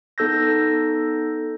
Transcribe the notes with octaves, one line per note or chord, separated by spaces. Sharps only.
B3 D#4 A4 E6 G6 A#6